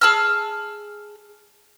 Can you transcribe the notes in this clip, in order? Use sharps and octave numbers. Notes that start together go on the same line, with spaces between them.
G#4 A5 E6 F6